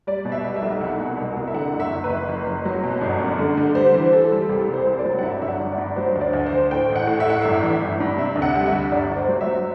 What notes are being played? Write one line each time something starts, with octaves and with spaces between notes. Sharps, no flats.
G3 D5
B2
E5
G3
E5
B1
C2 F#5
B2
C2
C2
E5
D3 F#5
F#1
E5
F#1
B4
F#1
F#1
F#1
F#3
B2
G1
F#2
D3
D3
G3 C5
E3
E3 A4
G3
C2 G4
C2
C5
C2
D5
F#3
F#5
G2 E5
G1 E5
F#5
G1
D5
G2
F#3 C5
D2
D5
D2
C5
D2
A2 G5
A1
F#5
A2
E5
A2 F#5
G1 E5
E3
G1
G2
C3 E5
D2
F#5
G3
E5
D2
G1 D5
G1
C5
F#3
E5
F#3